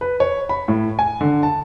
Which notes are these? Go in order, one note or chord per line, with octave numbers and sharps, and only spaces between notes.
B4
C#5
B5
A2
G#5
D3
A5